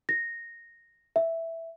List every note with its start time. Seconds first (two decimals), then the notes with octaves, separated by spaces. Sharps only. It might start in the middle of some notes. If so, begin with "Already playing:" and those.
0.09 A#6
1.16 E5